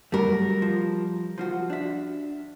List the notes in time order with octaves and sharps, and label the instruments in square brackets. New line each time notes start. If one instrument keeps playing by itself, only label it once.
[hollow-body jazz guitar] F#3 A3 [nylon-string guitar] G3 A#4
[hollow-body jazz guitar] F3
F3 F4 F#4
D4 E5